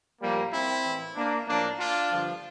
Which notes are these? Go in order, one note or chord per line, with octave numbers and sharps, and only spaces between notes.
A2 F3 G3 A#3
C4 E4
A2 E3
A#3 D4
A2 F3 A#3 D4
D4 F4
G2 D3 F3